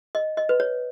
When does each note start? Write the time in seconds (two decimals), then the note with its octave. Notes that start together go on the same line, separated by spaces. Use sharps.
0.15 D#5
0.37 D#5
0.49 B4
0.60 C#5